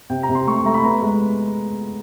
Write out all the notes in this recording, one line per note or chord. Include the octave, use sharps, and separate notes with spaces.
C3 G5
A#5
C3
C6
A3 C#6
A3 A#5
B5
B3 A#5
G#3